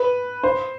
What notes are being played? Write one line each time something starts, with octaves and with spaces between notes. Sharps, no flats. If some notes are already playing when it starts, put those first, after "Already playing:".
Already playing: B4
C5